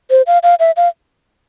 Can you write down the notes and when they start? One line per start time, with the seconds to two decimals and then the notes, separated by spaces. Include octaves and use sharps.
0.10 C5
0.27 F5
0.43 F5
0.60 E5
0.77 F5